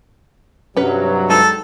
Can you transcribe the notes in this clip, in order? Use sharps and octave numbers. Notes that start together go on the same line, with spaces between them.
G2 C3 F#3 C#4 B4
G#3 D#4 G4 A4